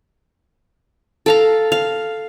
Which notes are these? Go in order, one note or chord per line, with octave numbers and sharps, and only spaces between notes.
A4 F5 A#5
F5